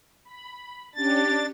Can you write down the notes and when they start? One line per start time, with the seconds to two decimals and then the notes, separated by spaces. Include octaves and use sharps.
0.24 B5
0.95 C#4 D4 G4 D6 A6